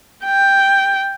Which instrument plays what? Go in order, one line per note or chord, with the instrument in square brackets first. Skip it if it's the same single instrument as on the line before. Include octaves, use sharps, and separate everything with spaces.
[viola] G5